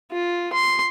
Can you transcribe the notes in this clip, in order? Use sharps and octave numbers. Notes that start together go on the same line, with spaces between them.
F4
C6